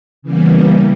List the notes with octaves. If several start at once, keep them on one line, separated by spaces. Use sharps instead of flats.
C#3 E3 G3 A#3 B3